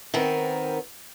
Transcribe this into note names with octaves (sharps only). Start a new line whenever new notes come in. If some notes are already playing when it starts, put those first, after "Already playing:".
D#3 B3 C4 A#4